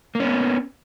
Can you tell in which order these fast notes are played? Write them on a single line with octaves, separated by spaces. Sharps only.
A#3 C#4 B3